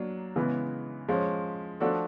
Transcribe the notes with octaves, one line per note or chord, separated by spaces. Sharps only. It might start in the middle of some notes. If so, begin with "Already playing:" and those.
Already playing: F#3 A#3 D4
C#3 E3 G#3 B3
F3 G#3 C#4
F3 A3 D4 F#4 A4